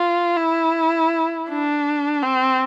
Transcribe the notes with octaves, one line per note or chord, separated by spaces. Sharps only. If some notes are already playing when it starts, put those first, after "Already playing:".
Already playing: F4
E4
D4
C4